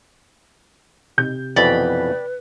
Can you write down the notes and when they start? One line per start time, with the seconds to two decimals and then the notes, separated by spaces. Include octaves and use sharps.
1.18 C3 G6
1.56 F2 B2 E3 B4 D5 G5 B5